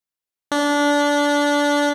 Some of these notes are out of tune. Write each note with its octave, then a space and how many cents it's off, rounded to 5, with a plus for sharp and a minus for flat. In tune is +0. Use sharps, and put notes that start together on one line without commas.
D4 -20